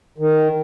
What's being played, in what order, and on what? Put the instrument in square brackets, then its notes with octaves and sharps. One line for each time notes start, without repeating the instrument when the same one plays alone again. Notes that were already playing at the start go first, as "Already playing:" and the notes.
[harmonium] D#3